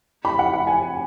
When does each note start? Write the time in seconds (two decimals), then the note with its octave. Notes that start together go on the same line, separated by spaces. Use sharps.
0.25 B5
0.39 F#5
0.53 F#5
0.67 G#5